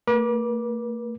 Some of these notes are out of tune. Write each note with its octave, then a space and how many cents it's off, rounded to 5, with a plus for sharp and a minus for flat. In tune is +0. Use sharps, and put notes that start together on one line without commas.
A3 +45 B4 -45 D6 +0